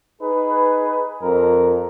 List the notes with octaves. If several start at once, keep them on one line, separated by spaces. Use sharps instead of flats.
D#4 G#4 B4
F2 A#4